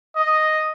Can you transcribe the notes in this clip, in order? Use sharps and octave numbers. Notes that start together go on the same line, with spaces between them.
D#5